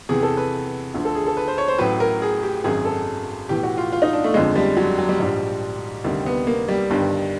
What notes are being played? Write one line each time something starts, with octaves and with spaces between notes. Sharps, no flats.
E2 C3 E3 G#4
A4
B4
D2 D3 F3
A4
G#4
A4
B4
C5
C#5
C5
A1 A2 F#3 B4
A#4
G#4
G4
G#1 F#2 D#3 F#3 G#4
A4
B1 A2 E3 G4
F#4
F4
F4
D#4
D4
A3
G1 F2 D3 F3 G#3
G3
F#3
F#3
G3
A#1 G#2 F3 G3
D2 C3 D#3 G3
B3
A#3
G3
G1 G2 D#3